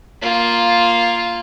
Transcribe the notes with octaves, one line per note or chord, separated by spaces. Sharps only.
A#3 F4